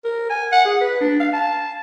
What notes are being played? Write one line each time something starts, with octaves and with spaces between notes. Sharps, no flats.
A#4
G#5
F#5
G#4
B4
D4
F5
A5